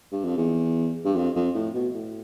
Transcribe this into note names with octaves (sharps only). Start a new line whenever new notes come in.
G2
F2
E2
G2
F2
F2
A2
B2
A2